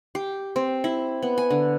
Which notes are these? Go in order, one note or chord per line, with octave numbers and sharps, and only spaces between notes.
G4
C4
E4
B3
G#5
D3